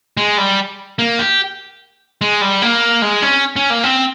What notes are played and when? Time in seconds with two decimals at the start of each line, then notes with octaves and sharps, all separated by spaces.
0.17 G#3
0.38 G3
0.99 A#3
1.19 G4
2.21 G#3
2.41 G3
2.62 A#3
3.02 G#3
3.22 C#4
3.56 C#4
3.70 A#3
3.84 C4